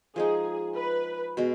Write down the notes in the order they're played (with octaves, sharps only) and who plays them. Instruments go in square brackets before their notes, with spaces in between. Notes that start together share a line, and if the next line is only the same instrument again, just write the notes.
[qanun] F3 G#3 D#4 [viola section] G#4
[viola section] B4
[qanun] B2 G#3